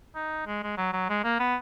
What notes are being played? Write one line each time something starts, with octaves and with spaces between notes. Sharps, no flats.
D#4
G#3
G#3
F#3
F#3
G#3
A#3
B3